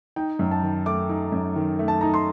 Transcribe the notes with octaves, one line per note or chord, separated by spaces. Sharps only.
D#4 G5
F#2
A5
D#3
A3 D6
D#4
F#2
D#3
A3
A5
D#4 A#5
C6